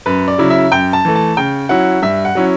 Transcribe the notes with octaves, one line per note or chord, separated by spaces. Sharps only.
F#2 B4
D5
C#3 F#3 C#4 E4
E5
F#2 G5
A5
E3 A3
A5
C#3 G5
F#3 C#4 E4 F#5
G2 E5
F#5
F#3 C#4 E4